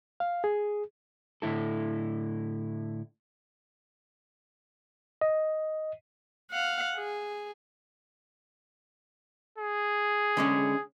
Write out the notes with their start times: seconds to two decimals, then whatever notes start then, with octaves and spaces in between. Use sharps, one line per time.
0.20 F5
0.44 G#4
1.42 A2 D3 E4 A4
5.21 D#5
6.52 F5 F#5
6.96 G#4
9.58 G#4
10.37 D3 G#3 C#4